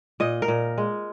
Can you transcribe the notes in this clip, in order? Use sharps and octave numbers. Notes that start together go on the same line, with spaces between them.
A#2 D#5
A#4
A#2
G#3